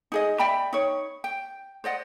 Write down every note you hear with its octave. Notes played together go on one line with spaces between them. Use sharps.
D#4 G#4 D#5
D5 E5 G5 B5
D#4 C#5
G5
C5 D5 D#5 F#5